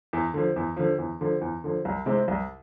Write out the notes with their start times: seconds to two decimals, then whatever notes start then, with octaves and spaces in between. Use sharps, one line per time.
0.13 E2
0.34 D3 F3
0.56 E2
0.77 D3 F3
0.98 E2
1.21 D3 F3
1.41 E2
1.64 D3 F3
1.85 C2
2.06 C3 G#3 C4 E4
2.28 C2